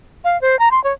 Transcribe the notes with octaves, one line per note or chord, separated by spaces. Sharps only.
F5
C5
A#5
C6
C#5